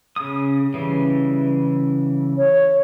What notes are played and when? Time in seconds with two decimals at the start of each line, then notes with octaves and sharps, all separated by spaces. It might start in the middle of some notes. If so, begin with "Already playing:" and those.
0.16 C#3 D#6
0.74 C#3 E3 G3
2.37 C#5